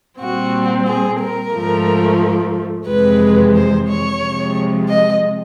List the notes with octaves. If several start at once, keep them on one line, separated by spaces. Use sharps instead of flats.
A#2 G3 C4 F#4
G#4
A#4
G#2 F3 A3
F2 C3 E3 G#3 B4
C5
C#5
C3 F3 G#3
D#5